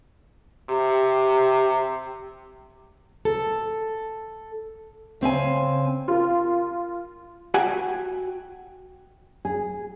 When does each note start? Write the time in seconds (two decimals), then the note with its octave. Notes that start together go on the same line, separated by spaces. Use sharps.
0.70 C3 G4
3.25 A4
5.21 C#3 C4 E5 G#5
6.08 F4 A#4
7.54 F#4 G5 G#5
9.45 G#4